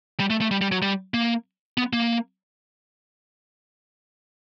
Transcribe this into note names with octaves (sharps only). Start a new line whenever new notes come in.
G3
A3
A3
G3
G3
F#3
G3
A#3
B3
A#3